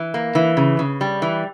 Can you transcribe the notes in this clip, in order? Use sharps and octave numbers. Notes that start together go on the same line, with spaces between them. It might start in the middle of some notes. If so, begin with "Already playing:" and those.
Already playing: E3
A#3
E3
C#3
C#3
G3
E3